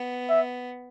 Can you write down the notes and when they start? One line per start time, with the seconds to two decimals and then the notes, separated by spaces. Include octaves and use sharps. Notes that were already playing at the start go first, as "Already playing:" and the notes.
Already playing: B3
0.29 E5